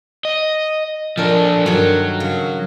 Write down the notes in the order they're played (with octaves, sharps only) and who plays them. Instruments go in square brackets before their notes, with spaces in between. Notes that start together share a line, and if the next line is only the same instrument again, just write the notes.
[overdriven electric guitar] D#5
[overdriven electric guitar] F3 D4 [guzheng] A4 A#4
[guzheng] G2 D#3 [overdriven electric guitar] F#3
[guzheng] C#3